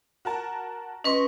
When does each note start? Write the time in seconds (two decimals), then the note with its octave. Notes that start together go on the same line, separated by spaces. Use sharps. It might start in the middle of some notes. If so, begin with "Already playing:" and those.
0.25 F#4 A#4 A5
1.04 C#4 B4 D#5 C6 C#6